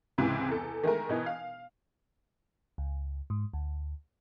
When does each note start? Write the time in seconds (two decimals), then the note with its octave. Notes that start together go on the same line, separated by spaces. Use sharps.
0.18 C#2 G#2 C3 E3
0.48 E2 A4
0.83 D#3 G#3 A3 A#4
1.09 B2 E3 D#4
1.26 F5
2.78 C#2
3.30 G#2
3.53 D2